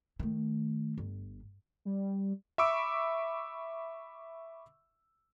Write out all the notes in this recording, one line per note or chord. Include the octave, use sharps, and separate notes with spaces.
D#3 A3
G1
G3
E5 B5 C#6 D6 E6 D7